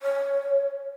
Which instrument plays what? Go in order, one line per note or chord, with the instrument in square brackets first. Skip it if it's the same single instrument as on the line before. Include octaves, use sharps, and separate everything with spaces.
[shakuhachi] C#5